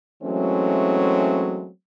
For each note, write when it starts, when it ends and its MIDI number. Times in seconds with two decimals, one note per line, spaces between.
0.23 1.67 52
0.23 1.67 54
0.23 1.67 56
0.23 1.67 57
0.23 1.67 60
0.23 1.67 61